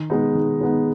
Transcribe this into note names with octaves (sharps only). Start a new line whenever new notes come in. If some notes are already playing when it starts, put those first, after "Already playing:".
Already playing: D#3
G#3 B3 D#4
D#3
G#3 B3 D#4